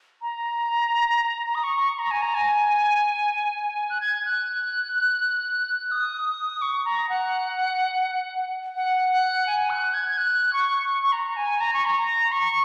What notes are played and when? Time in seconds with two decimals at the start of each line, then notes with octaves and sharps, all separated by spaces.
0.22 A#5
1.55 D#6
1.64 C#6
1.99 A#5
2.11 G#5
2.22 A#5
2.35 G#5
3.90 F#6
4.01 G#6
4.25 F#6
5.91 D#6
6.62 C#6
6.85 A#5
7.09 F#5
8.76 F#5
9.10 F#5
9.47 G#5
9.70 F#6
9.94 G#6
10.09 G#6
10.17 F#6
10.53 C#6
10.89 C#6
11.03 C#6
11.12 A#5
11.36 G#5
11.61 A#5
11.73 C#6
11.85 A#5
12.32 C#6